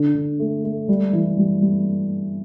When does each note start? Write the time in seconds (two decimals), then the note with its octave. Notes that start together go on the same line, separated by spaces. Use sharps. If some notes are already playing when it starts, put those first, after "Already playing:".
Already playing: D3
0.15 D3
0.39 A3
0.64 A3
0.88 G3
1.13 E3
1.38 G3
1.62 G3